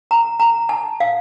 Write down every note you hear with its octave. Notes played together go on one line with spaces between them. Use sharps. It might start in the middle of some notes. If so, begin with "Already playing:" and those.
A#5
A#5
A5
F5